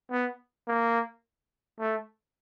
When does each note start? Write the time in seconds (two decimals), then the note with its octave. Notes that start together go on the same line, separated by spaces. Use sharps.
0.11 B3
0.67 A#3
1.79 A3